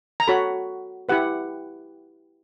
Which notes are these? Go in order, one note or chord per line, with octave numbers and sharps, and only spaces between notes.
A#5
F#4 A4 C#5 B5
E4 G4 B4 F#5